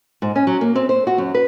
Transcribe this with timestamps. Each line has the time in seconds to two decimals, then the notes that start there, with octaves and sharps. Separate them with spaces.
0.22 G#2
0.36 C#4
0.47 F#3
0.61 A#3
0.75 C4
0.89 C5
1.07 F#4
1.18 F#2
1.34 B4